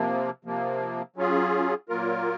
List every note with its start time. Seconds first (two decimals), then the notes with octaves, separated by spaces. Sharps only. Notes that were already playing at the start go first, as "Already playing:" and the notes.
Already playing: C3 F3 A#3
0.45 C3 F3 A#3
1.16 F#3 C#4 F4 G#4
1.89 A#2 F#3 A#3 F4 A#4